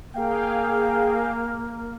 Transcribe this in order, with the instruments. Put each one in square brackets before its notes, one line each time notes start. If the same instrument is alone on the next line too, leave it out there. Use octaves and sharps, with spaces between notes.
[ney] A#3 [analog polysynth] G#4 F5 G5